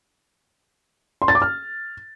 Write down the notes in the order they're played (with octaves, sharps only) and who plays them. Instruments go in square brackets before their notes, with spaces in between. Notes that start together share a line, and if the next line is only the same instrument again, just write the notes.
[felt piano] C6
A6
D6
F6